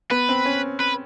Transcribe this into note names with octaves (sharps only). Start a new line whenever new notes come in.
B3 B4
C4
C#4
B4